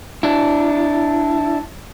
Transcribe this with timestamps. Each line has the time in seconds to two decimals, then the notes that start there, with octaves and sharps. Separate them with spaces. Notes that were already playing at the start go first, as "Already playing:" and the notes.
0.23 D4 E4